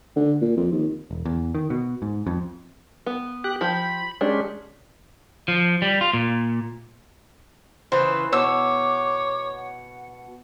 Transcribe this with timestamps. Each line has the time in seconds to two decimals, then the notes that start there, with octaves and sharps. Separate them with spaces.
0.16 D3
0.42 A#2
0.57 F2
0.72 D#2
1.11 E1
1.25 E2
1.55 D#3
1.70 B2
2.02 G#2
2.26 F2
3.06 B3
3.44 G4 F#6
3.61 F3 G4 B5
4.21 G#3 C#4 D4 G4
5.48 F3
5.82 G3
6.01 F4
6.14 A#2
7.92 C#3 E3 B4 C5
8.33 B2 C#5 D6 E6
9.56 F#5